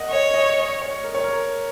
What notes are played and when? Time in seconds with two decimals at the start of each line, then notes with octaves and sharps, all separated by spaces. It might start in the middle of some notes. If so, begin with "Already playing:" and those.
Already playing: A#4 D#5 F#5
0.10 C#5 D#5
0.34 D#5
0.58 D#5
0.82 C#5
1.04 A#4
1.14 C#5
1.24 A#4